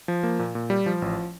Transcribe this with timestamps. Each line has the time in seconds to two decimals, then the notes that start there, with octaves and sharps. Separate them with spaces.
0.08 F3
0.23 A#3
0.39 A#2
0.55 A#2
0.70 G3
0.86 F3
1.02 A1